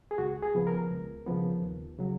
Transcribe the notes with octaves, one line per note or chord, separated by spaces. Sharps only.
G#4
C#2 F#4
G#4
C#3 F3 B3
A#4
C#2
C#3 F3 B3
D#2
C#3 F#3